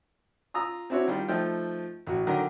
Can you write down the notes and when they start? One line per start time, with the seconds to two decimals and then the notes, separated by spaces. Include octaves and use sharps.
0.54 F4 A#5 D#6 E6
0.90 C4 D4 E4 F#4 C#5
1.08 D#3 G3 F4
1.29 F3 A3 D#4 G5
2.07 A1 F#4
2.27 D3 D#3 F#3 A#4